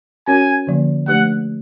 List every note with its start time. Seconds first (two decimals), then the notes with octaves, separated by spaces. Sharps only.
0.27 C#4 F#4 A#4 C#5 G#5
0.67 D3 F3 A#3
1.08 F3 A3 D4 G4 B4 F#5